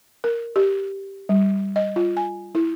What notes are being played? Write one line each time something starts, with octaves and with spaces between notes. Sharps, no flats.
A#4
G4
G3
D#5
F4
G#5
E4